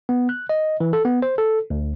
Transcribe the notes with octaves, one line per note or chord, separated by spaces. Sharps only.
B3
F#6
D#5
E3
A4
B3
C5
A4
D2